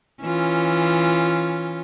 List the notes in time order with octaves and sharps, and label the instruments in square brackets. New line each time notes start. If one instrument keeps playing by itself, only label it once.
[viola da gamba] E3 C#4 F4